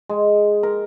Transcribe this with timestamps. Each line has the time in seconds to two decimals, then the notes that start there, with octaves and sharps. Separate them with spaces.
0.09 G#3
0.63 A#4